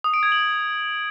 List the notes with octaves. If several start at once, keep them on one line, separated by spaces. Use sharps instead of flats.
D#6
D7
G#6
F#7